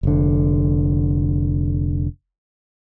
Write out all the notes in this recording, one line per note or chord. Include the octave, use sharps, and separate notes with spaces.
F1 D3